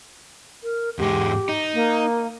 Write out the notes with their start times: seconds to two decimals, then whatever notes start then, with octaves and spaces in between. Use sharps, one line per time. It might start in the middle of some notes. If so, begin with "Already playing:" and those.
0.63 A#4
0.99 E2 G#2 G#3 G4
1.49 D#4
1.74 A#3